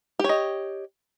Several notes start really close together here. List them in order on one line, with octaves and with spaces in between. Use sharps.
G4 C#5 D#5